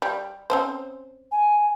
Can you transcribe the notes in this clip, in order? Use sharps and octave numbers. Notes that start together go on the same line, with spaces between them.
G3
C4 C#4 C5
G#5